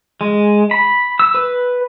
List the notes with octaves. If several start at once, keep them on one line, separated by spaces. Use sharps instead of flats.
G#3
B5
E6
B4